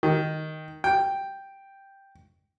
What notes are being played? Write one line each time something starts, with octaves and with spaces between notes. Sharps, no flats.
D#3
G5